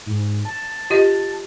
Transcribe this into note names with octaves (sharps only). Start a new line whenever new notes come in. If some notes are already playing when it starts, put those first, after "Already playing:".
G#2
A5
F4 G4 D#5